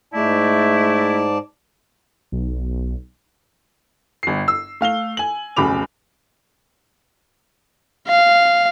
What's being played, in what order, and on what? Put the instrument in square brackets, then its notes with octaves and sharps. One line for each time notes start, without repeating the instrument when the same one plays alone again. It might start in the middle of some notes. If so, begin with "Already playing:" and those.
[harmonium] G#2 D5 A5 [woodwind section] G#3 A3 E4
[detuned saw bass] B1
[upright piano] G1 C7
E6
A3 F5 F7 G7
G#5 F#7
F1 B1 C#3 B5 D6 F7
[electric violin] F5